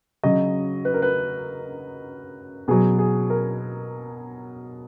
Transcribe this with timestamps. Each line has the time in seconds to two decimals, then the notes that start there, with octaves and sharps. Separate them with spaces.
0.23 C#3 F#3 D#5
0.85 B4
0.94 A#4
1.02 B4
2.68 B2 F#3 G#4
2.99 G#4
3.30 A#4